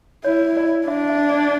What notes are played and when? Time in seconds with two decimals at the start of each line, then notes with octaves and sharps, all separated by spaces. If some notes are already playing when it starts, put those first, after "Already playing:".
0.25 E4 C#5
0.57 D5
0.88 D4 E5
1.09 E5
1.30 D5